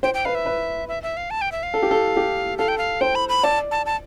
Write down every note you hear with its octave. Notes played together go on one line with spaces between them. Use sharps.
C5 G5
G5
B4 F5
E5
B4
E5
E5
F5
A5
G5
E5
F5
A4
G4
A4
G4
A4 F5
G5
F5
C5 G5
B5
B5
D5 A5
A5
A5